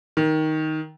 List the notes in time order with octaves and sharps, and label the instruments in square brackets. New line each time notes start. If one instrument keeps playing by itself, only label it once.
[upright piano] D#3